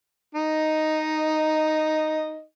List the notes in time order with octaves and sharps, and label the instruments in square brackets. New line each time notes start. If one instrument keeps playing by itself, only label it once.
[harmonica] D#4 D#5